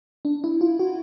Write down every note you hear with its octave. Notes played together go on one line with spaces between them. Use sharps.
D4
E4
F4
F#4